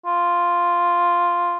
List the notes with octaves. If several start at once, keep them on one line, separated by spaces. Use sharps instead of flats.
F4